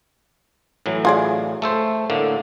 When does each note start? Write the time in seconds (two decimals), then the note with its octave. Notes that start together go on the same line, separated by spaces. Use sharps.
0.86 A2 E3 F#3
1.05 F4 G#4 D5
1.62 A3 A4 C5
2.10 A2 D3 A#3